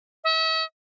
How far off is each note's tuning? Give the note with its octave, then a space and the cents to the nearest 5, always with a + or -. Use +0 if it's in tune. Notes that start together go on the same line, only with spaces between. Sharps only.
E5 -40